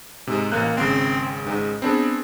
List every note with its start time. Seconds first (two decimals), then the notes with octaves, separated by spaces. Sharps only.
0.27 G#2 C3
0.52 A1 A#3 F#6
0.77 G#1 C#3 C4
1.45 G#2
1.82 B3 C4 D4 G#4